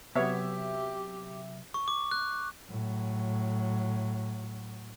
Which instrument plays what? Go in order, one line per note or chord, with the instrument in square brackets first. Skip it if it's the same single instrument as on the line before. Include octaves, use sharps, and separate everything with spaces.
[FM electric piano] C3 F#3 [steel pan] B3 C#5 [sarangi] G4 [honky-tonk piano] E5
[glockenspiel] C#6
D6
F#6
[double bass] A2 F#3